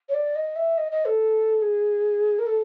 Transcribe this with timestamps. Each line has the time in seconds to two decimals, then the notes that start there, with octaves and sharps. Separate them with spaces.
0.09 C#5
0.14 D5
0.35 D#5
0.56 E5
0.77 D#5
0.92 D#5
1.05 A4
1.61 G#4
2.38 A#4
2.46 A4